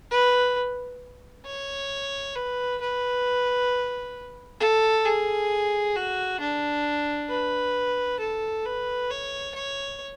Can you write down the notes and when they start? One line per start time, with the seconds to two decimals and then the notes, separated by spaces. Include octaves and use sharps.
0.11 B4
1.46 C#5
2.36 B4
2.81 B4
4.60 A4
5.05 G#4
5.96 F#4
6.40 D4
7.30 B4
8.20 A4
8.66 B4
9.10 C#5
9.54 C#5